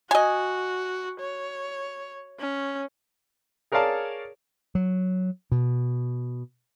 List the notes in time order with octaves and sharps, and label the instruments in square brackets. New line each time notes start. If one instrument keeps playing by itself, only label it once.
[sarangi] F#4 [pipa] D#5 G#5
[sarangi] C#5
C#4
[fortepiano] G#4 A#4 C#5 D5 F5 A5
[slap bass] F#3
B2